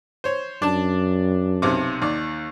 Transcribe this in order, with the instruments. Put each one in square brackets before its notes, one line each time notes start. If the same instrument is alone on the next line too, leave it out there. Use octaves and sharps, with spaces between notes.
[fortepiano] C5 C#5
[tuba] F#2 [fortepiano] D4 A5
[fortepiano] B1 C3 D6
D#2 D5